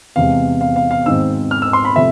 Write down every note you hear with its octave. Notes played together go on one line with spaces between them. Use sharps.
E2 C3 G#3 F5
F5
F5
F5
G#1 G#2 G#3 C4 E6
F6
E6
C6
B5
C3 F3 A3 E5